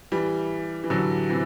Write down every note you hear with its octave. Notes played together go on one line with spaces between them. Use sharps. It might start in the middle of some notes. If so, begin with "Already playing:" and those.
E3 G3
E3
D3 F#3
C3 E3